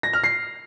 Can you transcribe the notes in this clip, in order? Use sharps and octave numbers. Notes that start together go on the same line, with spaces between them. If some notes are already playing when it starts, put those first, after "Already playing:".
A#6
F6
C7